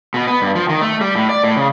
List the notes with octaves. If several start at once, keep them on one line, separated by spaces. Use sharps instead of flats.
B2
B3
G2
F3
D#3
A3
G3
A2
D5
A2
C#3